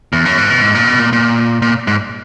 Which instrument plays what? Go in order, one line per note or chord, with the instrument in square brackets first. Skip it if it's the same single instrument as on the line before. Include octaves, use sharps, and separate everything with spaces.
[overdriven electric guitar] E2
F#2
G#2
B2
G#2
A#2
B2
A#2
A#2
A#2
G#2